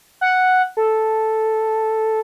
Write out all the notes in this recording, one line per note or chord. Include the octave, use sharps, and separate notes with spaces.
F#5
A4